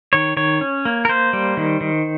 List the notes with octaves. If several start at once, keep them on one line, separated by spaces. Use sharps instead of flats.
D#3 C#5
D#3 C#5
C#4
A#3
A#4
A#3 C5
G3
D#3
D#3